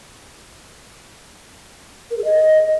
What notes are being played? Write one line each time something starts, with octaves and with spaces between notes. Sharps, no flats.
A#4
G#4
D#5